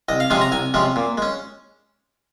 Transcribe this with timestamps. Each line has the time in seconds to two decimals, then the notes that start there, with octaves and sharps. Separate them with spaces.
0.09 C2 D#5
0.20 F5
0.30 C3 F3 G#3 C#4 G#5
0.41 A#5
0.52 C2 G#5
0.74 C3 F3 G#3 C#4
0.96 A#2
1.18 G#3 C#4